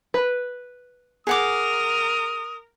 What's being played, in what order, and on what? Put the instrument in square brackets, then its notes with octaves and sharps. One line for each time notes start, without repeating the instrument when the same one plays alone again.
[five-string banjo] B4
[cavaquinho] G#4 F#5 D6 [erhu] A#4 [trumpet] D#6